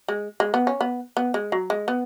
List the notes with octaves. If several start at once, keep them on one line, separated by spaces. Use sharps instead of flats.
G#3
G#3
B3
C#4
B3
B3
G#3
F#3
G#3
B3